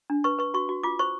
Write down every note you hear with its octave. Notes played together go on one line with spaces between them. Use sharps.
D4
B4 C#6
B4 C#6
F#4 C#6
F#4
F4 D6
C5 C#6